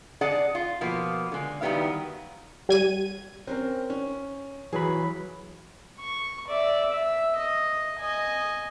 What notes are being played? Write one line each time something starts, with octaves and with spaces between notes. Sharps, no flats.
D4 G#4 D5 D#5 F#5 A5
F4
B2 F3 A#3 B3
D3 G#3
D#3 F#3 G3 B3 E4 F5
G3 G#6 D#7
C4 C#4 A#4
C#4
E3 F#3 G#4 B5
C#6
D5 E5
E5
D#5
D#5 G#5